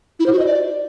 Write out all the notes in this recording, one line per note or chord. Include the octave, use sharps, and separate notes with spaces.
E4
C5
F#4
D#5
D5